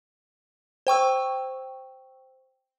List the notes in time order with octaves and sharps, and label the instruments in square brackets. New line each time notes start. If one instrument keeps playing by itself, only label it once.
[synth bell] C5 G5 C#6 E6